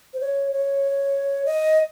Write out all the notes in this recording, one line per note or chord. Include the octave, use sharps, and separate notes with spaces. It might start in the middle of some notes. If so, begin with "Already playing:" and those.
C5
C#5
C#5
D#5